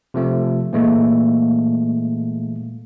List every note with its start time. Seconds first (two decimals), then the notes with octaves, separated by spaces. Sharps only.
0.14 C3 F3 A3
0.73 A#2 E3 G#3 A3